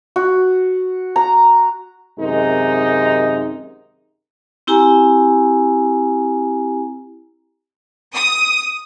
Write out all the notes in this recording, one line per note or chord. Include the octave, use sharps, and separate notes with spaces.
F#4
A#5
F#2 C3 D#3 G#3 D#4
C4 E4 G4 G#5 A#5
D#6